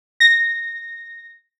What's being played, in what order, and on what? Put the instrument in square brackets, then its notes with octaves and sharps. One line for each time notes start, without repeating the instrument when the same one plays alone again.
[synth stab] A#6